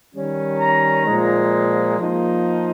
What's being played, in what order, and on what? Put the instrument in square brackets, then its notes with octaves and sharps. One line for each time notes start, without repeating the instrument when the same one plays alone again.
[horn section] D#3 G3 C#4
A#5
A#2 F3 G#3
F3 A#3 D#4